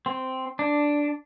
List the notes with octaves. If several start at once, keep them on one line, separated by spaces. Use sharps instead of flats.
C4
D4